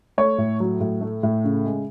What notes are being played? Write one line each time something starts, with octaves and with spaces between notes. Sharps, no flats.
A3 C#5
A2
F#3
A2
A3
A2
C#3
G#3